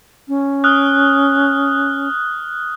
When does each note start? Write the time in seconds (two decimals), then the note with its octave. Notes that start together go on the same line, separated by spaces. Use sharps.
0.28 C#4
0.64 D#6 F6 F#6